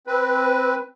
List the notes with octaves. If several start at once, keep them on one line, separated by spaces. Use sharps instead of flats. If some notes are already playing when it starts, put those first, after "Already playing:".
C4 B4